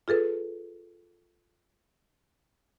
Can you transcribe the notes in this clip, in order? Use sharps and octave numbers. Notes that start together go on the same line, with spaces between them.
F4 G#4 A4 B4